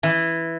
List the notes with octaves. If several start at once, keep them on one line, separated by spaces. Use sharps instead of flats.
E3